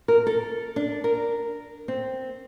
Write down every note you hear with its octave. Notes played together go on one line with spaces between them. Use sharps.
A#4
A4
D4
A#4
C4